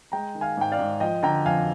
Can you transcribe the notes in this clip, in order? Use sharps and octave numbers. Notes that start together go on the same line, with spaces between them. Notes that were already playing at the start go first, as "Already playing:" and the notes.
G#3 G5 A#5
D#3
F5 G#5
G#2 G5
D5 F5
G#2
F3 D#5 G5
D3 G5 A#5
F2 F5 G#5